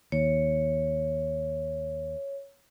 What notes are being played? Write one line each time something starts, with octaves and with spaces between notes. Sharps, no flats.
D#2 C#5